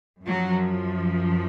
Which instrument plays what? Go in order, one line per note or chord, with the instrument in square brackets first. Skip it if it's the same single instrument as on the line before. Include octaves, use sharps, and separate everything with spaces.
[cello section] F#2 F3 F#3